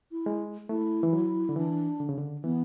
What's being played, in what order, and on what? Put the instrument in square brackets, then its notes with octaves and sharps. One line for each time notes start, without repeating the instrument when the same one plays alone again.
[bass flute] E4
[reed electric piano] G#3
[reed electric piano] A3 [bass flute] E4
[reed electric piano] E3
F#3
D3
[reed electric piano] E3 [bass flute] D4
[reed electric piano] D3
C#3
D3
[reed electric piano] E3 [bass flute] B3